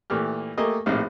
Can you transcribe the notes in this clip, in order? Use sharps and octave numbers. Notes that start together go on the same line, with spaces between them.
A#2 E3 A3 G4 F6
A3 A#3 G4 D#5 G#5
A#1 A2 C4 D#4 G4 F5